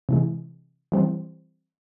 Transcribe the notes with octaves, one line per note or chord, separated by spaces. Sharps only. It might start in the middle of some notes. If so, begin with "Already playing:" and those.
C3 E3 G#3
E3 G3 C4